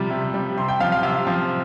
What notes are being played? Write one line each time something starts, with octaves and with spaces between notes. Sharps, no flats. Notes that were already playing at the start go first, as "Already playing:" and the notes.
Already playing: C3 F3 G3
C3
G3
C3 C6
G5
F3 F5
F5
C3 F5
F3